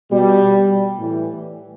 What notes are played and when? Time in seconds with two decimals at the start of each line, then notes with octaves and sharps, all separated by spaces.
0.11 B2 G3
0.98 A2 E3